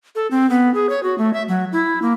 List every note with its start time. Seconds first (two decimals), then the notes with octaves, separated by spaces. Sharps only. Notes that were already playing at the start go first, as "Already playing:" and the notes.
0.15 A4
0.31 C4
0.50 B3
0.74 G#4
0.89 C#5
1.03 F#4
1.18 A3
1.34 E5
1.48 F#3
1.72 E4
2.02 A#3